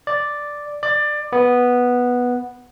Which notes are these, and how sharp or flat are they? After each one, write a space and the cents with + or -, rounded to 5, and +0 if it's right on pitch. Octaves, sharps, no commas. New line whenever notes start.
D5 +0
D5 +20
B3 -5